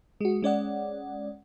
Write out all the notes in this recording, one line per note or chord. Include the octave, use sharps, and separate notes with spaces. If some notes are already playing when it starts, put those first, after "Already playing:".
G#3 F#4
G#3 C#4 D5 F#5